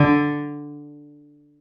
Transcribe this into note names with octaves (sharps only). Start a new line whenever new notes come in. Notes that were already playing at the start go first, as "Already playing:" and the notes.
Already playing: D3